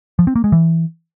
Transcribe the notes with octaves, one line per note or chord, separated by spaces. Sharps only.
F3
C4
A#3
G#3
E3